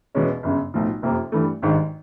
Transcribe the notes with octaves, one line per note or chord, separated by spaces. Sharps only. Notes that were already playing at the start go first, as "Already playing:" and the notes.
E1 E2 B2 G#3 C#4
G1 F#2 C#3
B1 A2 F3
F#1 F2 C3 F3 A#3
G2 E3 A3
G#1 G2 D#3 G#3